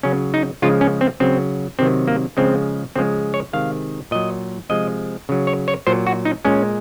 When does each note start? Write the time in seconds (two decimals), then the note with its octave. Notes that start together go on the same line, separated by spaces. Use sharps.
0.03 C#3 F#3 C#4
0.34 D#4
0.62 C#3 F3 G#3 F4
0.81 C#4
1.01 C4
1.20 C#3 F#3 C4
1.79 C3 D#3 F#3 C4
2.08 A#3
2.37 C#3 F3 G#3 C4
2.96 C#3 F3 G#3 C4
3.34 C#5
3.53 C3 D#3 G#3 F5
4.11 A#2 F#3 D#5
4.69 C3 F3 G#3 D#5
5.29 C#3 F#3
5.47 C#5
5.68 C#5
5.87 A#2 F#3 C5
6.07 F#4
6.25 D#4
6.45 A#2 G#3 C#4